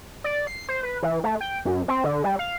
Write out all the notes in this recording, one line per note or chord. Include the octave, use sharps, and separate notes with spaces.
D5
C7
C5
B4
E3
A3
G5
F#2
C4
D3
G3
F5